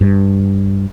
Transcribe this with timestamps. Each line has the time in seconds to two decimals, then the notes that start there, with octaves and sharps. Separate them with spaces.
0.01 G2